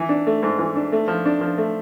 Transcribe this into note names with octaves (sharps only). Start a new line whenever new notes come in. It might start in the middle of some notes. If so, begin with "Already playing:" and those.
Already playing: E3
D4
A3
G#2
E3
D4
A3
F3
D4
F3
A3